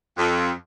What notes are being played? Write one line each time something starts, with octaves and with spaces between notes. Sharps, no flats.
F2